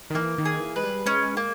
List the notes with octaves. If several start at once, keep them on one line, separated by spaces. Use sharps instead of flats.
D#3
E3 A#3
D#3
G#4
E3
G#3 B4
G3
G#3 C#4
A#3